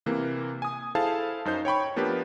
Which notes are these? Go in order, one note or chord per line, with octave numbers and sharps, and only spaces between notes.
C3 E3 A#3
G#5 D#6
E4 G#4 A4 C5 F5 A5
F#2 D#4 C5 G6
C#5 G5 B5 C#6
F3 A#3 B3 D4 G4 B4